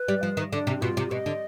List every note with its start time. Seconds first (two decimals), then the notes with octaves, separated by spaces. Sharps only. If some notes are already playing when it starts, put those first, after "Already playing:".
Already playing: B4
0.08 G3
0.23 F3
0.37 D#3
0.52 D3 D4
0.67 C3
0.82 B2 F4
0.97 C3
1.11 B2 D#5
1.26 D3